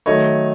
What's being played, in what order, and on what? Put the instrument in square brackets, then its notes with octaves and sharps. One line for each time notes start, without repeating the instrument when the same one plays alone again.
[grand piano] D#3 F#3 A3 C#5 D#5